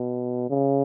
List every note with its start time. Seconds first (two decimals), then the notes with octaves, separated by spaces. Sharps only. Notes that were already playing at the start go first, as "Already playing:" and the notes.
Already playing: B2
0.50 C#3